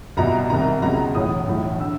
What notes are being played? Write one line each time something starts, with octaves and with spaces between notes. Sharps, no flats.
C2 B2 A#5
C2 C3 D#3 A#5
C#2 B2 A#5
B1 A2 E3 D#6
B1 A2 E3
D3 E6